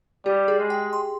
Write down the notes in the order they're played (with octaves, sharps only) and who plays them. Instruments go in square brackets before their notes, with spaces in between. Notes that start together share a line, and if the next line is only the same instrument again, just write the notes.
[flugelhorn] G3 [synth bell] G4
[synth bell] G#4
[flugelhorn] G#3
[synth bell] G5
C6